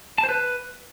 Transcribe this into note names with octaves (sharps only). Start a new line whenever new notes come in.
A5
C5
B4